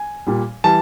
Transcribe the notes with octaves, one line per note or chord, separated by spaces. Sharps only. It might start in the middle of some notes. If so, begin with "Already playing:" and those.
Already playing: G#5
A#2 G3
E3 G3 A5